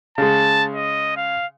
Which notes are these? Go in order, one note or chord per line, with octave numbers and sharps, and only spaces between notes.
C#3 G#3 A5
D#5
F5